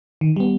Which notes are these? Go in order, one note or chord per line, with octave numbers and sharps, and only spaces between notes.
D#3
G3 B3